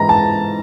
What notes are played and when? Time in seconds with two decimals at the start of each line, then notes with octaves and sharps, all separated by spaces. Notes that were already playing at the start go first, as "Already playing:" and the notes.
Already playing: G#2 E3 A#5
0.09 A5